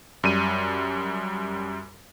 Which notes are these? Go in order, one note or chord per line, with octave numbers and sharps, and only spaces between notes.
F#2 G3 D#7